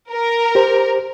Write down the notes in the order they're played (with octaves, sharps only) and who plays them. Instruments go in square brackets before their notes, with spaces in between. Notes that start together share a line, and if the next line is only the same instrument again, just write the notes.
[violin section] A#4
[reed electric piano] G4 C5